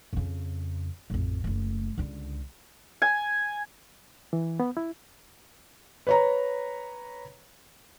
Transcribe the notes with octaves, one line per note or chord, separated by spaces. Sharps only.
F2 C#3
A1 F2
F#1 A3
C#2 D3
G#5
E3
B3
E4
B4 C#5 A#5